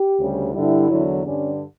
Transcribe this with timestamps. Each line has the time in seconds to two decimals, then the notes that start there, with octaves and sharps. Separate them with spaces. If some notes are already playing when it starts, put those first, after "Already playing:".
Already playing: G4
0.18 D2 C#3 G3
0.53 G2 D3 G3 E4
0.90 E2 D3 F#3
1.25 G2 D3 G3 C#4